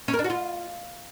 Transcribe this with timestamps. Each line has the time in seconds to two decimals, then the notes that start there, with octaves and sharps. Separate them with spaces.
0.08 C#4
0.13 A#4
0.19 D4
0.24 F#4
0.30 F4